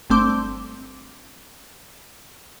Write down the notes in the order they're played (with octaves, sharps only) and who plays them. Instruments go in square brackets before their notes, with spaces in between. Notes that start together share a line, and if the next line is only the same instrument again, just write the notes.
[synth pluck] G1 A3 C4 D6